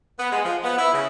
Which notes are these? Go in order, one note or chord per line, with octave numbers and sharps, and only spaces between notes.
B3
G#3
F3
B3
E4
C#3